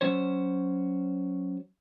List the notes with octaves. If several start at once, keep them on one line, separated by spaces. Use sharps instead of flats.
F#3 C#4 C5 C#5